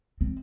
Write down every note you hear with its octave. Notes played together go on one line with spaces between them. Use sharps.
C4